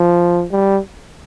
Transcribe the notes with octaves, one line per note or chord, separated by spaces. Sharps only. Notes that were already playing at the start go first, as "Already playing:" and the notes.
Already playing: F3
G3